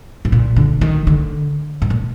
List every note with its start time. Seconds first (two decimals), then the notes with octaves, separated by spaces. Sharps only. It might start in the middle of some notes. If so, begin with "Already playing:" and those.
0.25 G#2
0.32 A#2
0.57 D3
0.81 D#3
1.07 D3
1.82 G#2
1.90 A#2